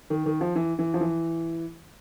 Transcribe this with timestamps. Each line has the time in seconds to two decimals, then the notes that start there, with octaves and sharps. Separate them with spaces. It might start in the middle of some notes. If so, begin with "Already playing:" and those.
0.10 D#3
0.26 D#3
0.41 F3
0.56 E3
0.79 E3
0.94 F3
1.00 E3